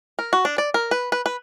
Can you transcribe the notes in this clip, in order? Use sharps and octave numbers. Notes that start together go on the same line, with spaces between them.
A#4
F#4
D4
D5
A#4
B4
B4
B4